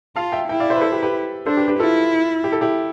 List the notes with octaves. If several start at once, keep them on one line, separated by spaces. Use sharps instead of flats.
F4 F5 A5
E5 G5
E4 E5 G5
D5 F5
C5 E5
B4
A4 C5
G4 B4
G4 B4
D4 A4 C5
G4 B4
G4 B4
E4 F4 A4
G4
A4
E4 G4